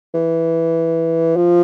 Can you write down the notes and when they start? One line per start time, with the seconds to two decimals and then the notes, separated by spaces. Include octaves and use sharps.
0.15 E3
1.36 F3